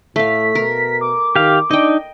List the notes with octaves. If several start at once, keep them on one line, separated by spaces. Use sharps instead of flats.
A2 A3 F5 B6
B2 A#4
D6
D#3 G4 F5
D4 D#4 D#5 G5